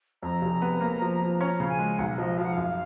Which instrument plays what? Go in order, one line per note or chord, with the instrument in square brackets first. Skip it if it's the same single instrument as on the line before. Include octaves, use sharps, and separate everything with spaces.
[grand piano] F2 [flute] A#5
[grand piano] F1
B3
A#3
F3
F3
[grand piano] C#4 [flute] A#5
[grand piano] C#3
[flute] G#5
[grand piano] G#3
[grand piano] B1 [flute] F#5
[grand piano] F3 [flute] D#5
[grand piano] F3 [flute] F5
[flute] F#5
[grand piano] F#2 [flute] F5